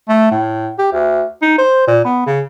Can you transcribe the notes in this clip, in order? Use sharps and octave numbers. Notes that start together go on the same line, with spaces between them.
A3
A2
G4
D2
D#4
C5
A#2
B3
C#3